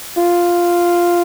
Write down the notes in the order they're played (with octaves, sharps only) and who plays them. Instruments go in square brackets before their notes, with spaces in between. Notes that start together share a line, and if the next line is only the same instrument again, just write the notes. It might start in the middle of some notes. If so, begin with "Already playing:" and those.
[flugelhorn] F4